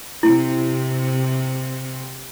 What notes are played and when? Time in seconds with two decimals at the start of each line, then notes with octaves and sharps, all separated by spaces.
0.23 C3 E4